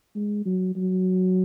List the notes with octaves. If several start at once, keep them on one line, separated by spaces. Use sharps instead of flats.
G#3
F#3
F#3